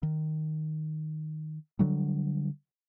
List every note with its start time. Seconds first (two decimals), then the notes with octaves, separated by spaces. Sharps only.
0.03 D#3
1.79 D3 F#3 G3